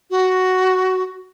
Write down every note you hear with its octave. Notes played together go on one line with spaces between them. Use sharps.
F#4